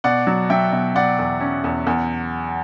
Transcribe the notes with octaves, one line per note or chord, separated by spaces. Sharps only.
B2 D5 F#5
F#3
F#3 E5 G5
B2
B2 D5 F#5
E2
C#4
E2
E2